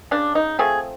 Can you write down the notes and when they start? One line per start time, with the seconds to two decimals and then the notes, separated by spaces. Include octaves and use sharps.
0.11 C#3 D4
0.35 D#4
0.59 F3 A3 C4 G#4